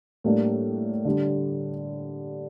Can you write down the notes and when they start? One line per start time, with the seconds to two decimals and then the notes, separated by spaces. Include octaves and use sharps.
0.24 A2 G3 A#3 D4
1.05 D3 G3 D4